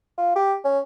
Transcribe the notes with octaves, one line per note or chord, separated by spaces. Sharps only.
F4
G4
C#4